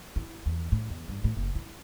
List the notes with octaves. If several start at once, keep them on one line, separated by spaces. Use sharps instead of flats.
E4
E2
A2
E2
G2
A2
F#1
E4